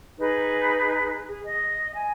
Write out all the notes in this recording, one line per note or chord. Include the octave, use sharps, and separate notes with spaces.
D#4 G#4 B4
G#4
D#5
G#5